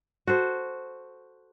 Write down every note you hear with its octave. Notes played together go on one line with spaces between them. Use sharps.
F#4 A4 C5